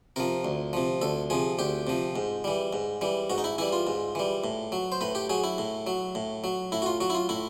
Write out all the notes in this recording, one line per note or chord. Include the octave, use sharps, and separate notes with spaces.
C3 F3 A#4
D2
C3 F3
D2 A4
C3 F3 G#4
D2 G4
C3 F3
G#2
E3 G3
G#2
E3 G3
G#2 F#4
D#4
E4
E3 G3 E4
F4
G#2
E3 G3
A2
F#3
C5
A2 B4
G4
F#3 G#4
E4
A2
F#3
A2
F#3
A2 E4
F#4
F4
F#3 F#4
E4
F4
A2 E4